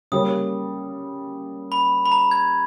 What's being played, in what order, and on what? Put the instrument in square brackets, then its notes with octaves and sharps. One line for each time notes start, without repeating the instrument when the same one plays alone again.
[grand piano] C#3 G3 A#3 C#4 [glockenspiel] D#6
[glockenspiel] B5
B5
A#5
G#6